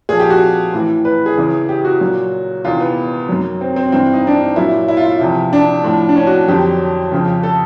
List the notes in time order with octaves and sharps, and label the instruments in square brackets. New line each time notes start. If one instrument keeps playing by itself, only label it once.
[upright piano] A#2 F3 G#4
G4
F#4
A2 E3
B4
G#4
E2 C#3 E3
G4
F#4
A#2 F#3
E2 C3 D#3 F4
B3
F#2 D#3 F#3
C4
C4
G2 E3 C4
D#4
D4
D#4
A#2 F#3 E4
E4
F4
E4
E2 C3 F3
D4
A2 F3
D4
C#4
F#4
F2 D3 F#3 G4
F2 C#3 F3
A4